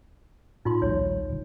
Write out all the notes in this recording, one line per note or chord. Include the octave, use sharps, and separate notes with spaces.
A2 D#4 F4 C6
A#1 D#2 G3 C#5
D1 D3